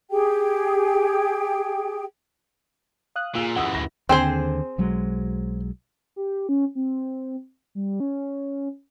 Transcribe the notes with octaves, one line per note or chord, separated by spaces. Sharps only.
G4 G#4 G5
F5 D#6 F#6
A#2 F4 G#4 E6
F#2 E3 F#5 D#6 E6
D2 A#6
D#2 D3 C4 G#4 C5
B1 F#3 G#3
G4
C#4
C4
G3
C#4